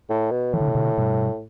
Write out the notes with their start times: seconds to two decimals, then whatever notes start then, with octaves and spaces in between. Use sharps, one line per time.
0.10 A2
0.31 B2
0.53 A2 E3
0.60 D3
0.68 C3
0.75 B2 D3
0.98 G2 B2